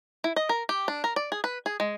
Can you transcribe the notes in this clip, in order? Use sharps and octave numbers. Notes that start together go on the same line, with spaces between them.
E4
D#5
A#4
G4
D4
A#4
D5
G#4
B4
G#4
G#3